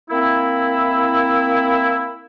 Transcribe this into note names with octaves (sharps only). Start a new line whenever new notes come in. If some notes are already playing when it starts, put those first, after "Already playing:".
A#3 C4 E4